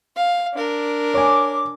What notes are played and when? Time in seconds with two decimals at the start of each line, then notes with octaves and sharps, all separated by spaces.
0.16 F5
0.54 D4 A#4
1.14 C#5 G#5 D6